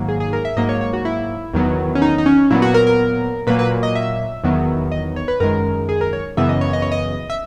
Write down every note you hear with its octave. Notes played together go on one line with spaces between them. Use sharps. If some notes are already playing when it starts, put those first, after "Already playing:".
Already playing: G#2 D#3 F#3 A#3
G#4
G#4
A#4
E5
G#2 F#3 A#3 D#5
C#5
C#5
F#4
E4
E2 D#3 F#3 B3
C#4
D#4
D#4
C#4
A#2 F#3 B3 E4
F#4
A#4
A#4
A#2 F#3 A#3 B4
B4
D#5
E5
E2 D#3 F#3 B3
D#5
C#5
B4
F#2 D#3 G#3 A#4
G#4
A#4
C#5
F#2 C#3 E3 B3 E5
D#5
C#5
D#5
C#5
D#5
E5